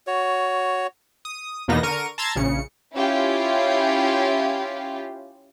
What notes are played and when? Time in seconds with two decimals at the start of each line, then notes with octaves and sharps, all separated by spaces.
0.07 F#4 C#5
1.25 D#6
1.68 E2 B2 A#3 B3 D#4 A#6
1.83 D3 A#4 C#6 D#7
2.18 A5 A#5 C6 E6 G#6 A6
2.36 A#1 C#3 C#7
2.96 C#4 E4 F4 G4